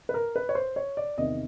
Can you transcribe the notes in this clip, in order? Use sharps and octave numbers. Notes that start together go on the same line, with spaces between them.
B4
A#4
B4
C#5
C5
C#5
D5
E2 C3 D#3 D#5